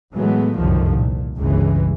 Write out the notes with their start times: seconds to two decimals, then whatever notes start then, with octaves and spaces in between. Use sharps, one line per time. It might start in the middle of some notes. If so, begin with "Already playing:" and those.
0.12 A2 E3 F#3 G#3 A3 B3
0.55 F1 C2 F#2 D3 D#3 F3
0.94 A#2
1.38 G1 C#2 C#3 E3 G#3